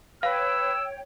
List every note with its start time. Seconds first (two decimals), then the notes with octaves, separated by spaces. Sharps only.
0.23 B4 C#5 F5 G5 E6